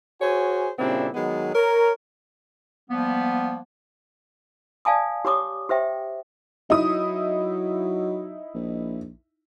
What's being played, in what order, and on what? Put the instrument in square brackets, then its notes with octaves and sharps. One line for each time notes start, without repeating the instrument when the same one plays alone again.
[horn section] F#4 G#4 C5 C#5 G#5
A#2 C#3 G3 C4 D4 E4
D#3 F#3 G#3 B3
A#4 C#5
[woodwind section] F3 G3 A#3 B3
[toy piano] D5 F5 G#5 A5 D#6
G4 C#5 D6 D#6
G4 C5 E5 G5
[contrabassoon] F#3 [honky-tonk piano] D#4 E4 D#6
[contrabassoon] A#1